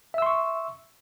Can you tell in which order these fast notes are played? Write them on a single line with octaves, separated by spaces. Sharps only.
E5 E6 C6 C#6